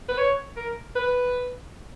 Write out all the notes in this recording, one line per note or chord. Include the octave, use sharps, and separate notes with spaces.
B4
C#5
A#4
B4